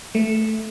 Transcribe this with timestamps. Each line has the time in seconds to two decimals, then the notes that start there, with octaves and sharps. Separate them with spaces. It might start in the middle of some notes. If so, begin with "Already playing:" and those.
0.15 A3